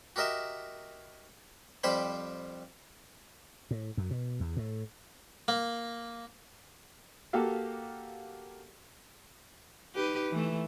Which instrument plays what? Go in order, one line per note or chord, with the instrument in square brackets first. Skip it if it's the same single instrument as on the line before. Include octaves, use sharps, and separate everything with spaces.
[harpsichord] F#4 G4 A#4 D#5 E5
F2 G3 G4 C5 G5 B5
[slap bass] A2
F#2
B2
E2
A2
[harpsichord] A#3
[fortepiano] A#3 F#4 G4 A4 F5
[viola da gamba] D#4 G4 B4
E3 A3